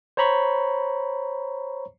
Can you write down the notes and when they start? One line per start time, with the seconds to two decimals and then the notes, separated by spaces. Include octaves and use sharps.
0.17 C5 C#5 A#5 B5 C#6